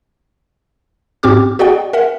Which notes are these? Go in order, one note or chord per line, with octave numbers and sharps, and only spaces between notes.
G#2 C4 F#4 G4 D6 F6
F#4 G#4 D5 D#5 F#5 G5
A#4 E5 F#5